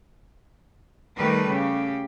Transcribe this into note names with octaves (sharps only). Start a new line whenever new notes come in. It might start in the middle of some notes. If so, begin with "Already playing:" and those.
D#3 G3 A3 A#4 B4
C#3 G4